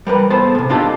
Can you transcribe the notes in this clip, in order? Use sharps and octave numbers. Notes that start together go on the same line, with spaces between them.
G3 A#4 B4
B3 A4 C5 A5
G#2 C3
D4 D#4 F4 G4 A4 D5